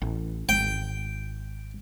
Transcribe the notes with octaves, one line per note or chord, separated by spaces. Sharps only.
A1
G#1 G5